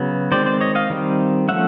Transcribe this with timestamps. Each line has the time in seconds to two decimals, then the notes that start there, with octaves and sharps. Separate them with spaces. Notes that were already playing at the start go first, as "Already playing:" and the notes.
Already playing: C#3 F#3 B3
0.32 D#3 G#3 C4 C5 D5
0.46 C5 D5
0.61 C#5 D#5
0.75 D#5 F5
0.90 D#3 G3 C4
1.48 F3 A3 C#4 E5 F#5